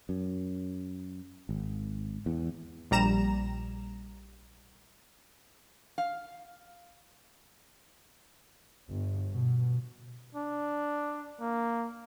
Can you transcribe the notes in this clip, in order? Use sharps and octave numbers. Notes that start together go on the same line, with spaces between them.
F#2
G#1
E2
A#1 G3 A#5 E7
F5
G1
B2
D4
A#3